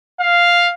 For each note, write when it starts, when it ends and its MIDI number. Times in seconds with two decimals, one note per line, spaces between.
0.20 0.70 77